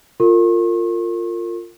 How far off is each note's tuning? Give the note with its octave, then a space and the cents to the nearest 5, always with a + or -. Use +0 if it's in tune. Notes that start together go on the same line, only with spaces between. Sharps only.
F4 +0 A#4 -35 C#6 -45